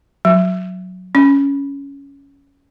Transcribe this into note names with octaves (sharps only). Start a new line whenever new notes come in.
F#3
C#4